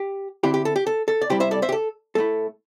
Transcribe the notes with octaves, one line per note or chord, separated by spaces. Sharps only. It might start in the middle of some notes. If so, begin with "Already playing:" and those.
Already playing: G4
D3 C4 E4 G4
G4
A4
G4
A4
A4
D5
C3 G3 E4 G4 C5
C5 E5
A4 D5
C5 E5
G4
A4
A2 A3 E4 A4